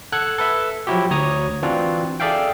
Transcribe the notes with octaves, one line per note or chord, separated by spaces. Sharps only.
A4 F#5 F#6 G#6
A4 B4 E5
F3 F#3 E4 F#4 G4
D2 C#5 A#5 D#6
E3 C4 D4 F4 F#4
G#4 A4 D5 E5 F5 G5